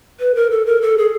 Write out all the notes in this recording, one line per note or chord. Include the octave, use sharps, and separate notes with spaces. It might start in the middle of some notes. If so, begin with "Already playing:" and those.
B4
A#4
A4
A#4
A4
G#4